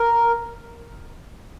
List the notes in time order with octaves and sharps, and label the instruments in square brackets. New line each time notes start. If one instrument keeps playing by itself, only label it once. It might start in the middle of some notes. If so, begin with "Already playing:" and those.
Already playing: [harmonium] A#4